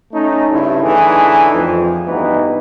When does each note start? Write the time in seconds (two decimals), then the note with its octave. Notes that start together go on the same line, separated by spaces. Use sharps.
0.13 A3 C#4 D#4
0.51 G2 C#3 E4
0.82 D3 E3 A3 D#4 G#4
1.53 F2
2.06 D2 G2 E3 B3 D#4